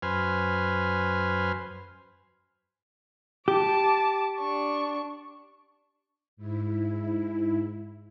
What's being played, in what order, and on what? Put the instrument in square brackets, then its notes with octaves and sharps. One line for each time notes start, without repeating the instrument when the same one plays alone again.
[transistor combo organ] F#2 B4 C5 G#5 F6
[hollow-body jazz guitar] G4 [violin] A5 D6
[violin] D4 C#6
[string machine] G#2 E4